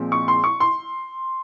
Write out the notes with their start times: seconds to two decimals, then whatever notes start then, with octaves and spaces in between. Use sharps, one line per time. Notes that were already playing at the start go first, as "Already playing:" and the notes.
Already playing: A#2 F3 G#3 C4
0.12 C#6
0.28 C6
0.44 C#6
0.60 C6